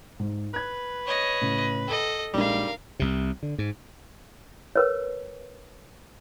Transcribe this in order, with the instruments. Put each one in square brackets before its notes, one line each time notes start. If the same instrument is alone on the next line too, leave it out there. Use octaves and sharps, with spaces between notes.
[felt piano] G#2
[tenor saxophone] B4 [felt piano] F#6 G#6
[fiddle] C#5 D#5
[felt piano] A2 C#3
[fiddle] A4 D#5 [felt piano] G5
[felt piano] A#1 G#3 D#4 [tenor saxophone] G3 [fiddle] A#4 F5
[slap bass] C2 C3
D3
G#2
[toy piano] A#4 B4 C#5